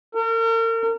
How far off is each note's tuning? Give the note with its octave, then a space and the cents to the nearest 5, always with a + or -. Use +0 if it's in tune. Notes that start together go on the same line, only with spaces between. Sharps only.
A#4 -40